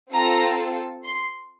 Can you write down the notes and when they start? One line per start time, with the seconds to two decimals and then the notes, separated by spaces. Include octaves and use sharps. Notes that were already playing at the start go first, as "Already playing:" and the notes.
0.13 C4 F4 A4 A#5
1.04 C6